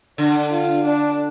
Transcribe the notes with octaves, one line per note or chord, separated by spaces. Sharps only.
D3 D4
F4
D4